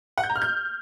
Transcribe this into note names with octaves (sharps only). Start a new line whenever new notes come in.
F#5
G6
A#5
F6
G6